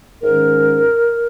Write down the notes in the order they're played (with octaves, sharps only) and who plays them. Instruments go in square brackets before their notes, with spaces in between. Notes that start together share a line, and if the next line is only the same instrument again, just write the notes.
[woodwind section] G#2 D#3 G#3 C#4 A#4